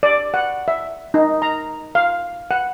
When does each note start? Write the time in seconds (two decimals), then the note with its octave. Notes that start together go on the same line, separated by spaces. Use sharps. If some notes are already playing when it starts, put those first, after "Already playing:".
0.03 D5
0.34 F#5
0.68 E5
1.14 D#4
1.42 A#5
1.95 F5
2.51 F#5